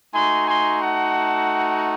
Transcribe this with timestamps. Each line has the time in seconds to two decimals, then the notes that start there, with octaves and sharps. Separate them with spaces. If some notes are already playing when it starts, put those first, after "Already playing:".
0.14 A3 D#4 F#4 G#5 C6
0.48 G#5 C6
0.82 F#5 A5